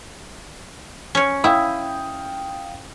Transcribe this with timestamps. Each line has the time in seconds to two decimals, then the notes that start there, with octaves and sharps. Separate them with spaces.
1.15 C#4 C#5
1.44 E4 F5 G5 D#6